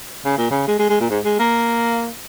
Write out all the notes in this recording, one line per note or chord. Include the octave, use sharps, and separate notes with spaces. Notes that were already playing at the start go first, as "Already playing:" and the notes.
C#3
A#2
C#3
G#3
G#3
G#3
A#2
G#2
G#3
A#3